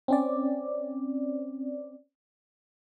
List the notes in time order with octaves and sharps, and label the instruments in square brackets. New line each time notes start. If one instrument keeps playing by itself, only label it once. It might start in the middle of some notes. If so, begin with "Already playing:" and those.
[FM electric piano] C4 C#4 D5